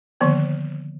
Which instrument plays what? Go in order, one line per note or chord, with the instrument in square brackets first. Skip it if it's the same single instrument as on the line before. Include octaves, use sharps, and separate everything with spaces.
[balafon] D3 D#3 F3 A#3 B3